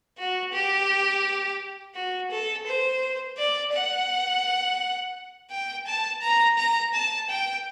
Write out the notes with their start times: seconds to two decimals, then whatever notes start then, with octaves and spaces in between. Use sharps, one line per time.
0.18 F#4
0.53 G4
1.95 F#4
2.31 A4
2.67 C5
3.37 D5
3.73 F#5
5.50 G5
5.87 A5
6.21 A#5
6.58 A#5
6.94 A5
7.29 G5